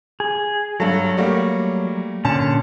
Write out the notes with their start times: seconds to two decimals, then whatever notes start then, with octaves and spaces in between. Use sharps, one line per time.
0.20 G#4
0.80 G2 F#3 A4
1.17 G3 A3 A#3
2.25 A#2 D3 C#4 A5